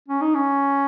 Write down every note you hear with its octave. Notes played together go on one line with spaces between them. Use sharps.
C#4
D#4
C#4